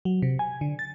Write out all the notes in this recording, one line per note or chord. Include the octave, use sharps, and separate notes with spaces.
F#3
C3
G#5
D3
A6